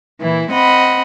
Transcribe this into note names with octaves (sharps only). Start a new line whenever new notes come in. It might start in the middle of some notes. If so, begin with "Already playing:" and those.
A#2 E3 E4
C4 D#5 F#5 B5